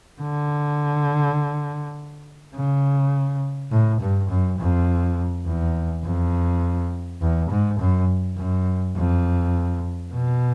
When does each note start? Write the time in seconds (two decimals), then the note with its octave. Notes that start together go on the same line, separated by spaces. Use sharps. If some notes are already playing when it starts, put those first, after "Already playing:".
0.22 D3
2.55 C#3
3.71 A2
4.01 G2
4.30 F#2
4.59 F2
5.46 E2
6.04 F2
7.21 E2
7.50 G#2
7.80 F#2
8.37 F#2
8.96 F2
10.13 B2